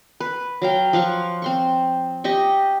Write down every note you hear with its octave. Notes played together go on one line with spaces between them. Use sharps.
B4
F#3 F5 G5
F3 F5 F#5 C#6
C4 C6 C#6
G4 D#5 C#6